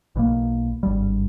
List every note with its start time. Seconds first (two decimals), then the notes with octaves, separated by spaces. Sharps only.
0.16 B1 B2 G3 A#3
0.83 G#1 G2 G3